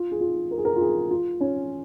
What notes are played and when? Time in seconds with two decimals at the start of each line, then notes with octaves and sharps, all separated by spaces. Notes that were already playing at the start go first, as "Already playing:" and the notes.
Already playing: F4
0.11 G#4
0.21 F4
0.51 A#4
0.58 G#4
0.65 A#4
0.76 F4
0.81 G#4
1.11 F4
1.41 C#4